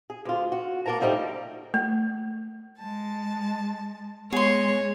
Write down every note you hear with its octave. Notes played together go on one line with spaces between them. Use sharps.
G#4
D2 F4
F#4
A#3 F#4 A#4 A5 A#5
A2 F3 G3 A3 D#4 G4
A3
G#3 A5
G#3 B3 G#4 C#5 C6